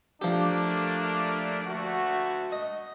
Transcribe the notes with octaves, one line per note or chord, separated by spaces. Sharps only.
F3 A3 A#3 D4 G4
D2 A3 F#4
D#5